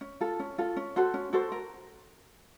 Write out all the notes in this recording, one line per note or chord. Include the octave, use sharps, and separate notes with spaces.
C#4
F4 A4
C#4
F4 A4
C#4
F#4 A4 C5
C#4
F#4 A4 C5
A#4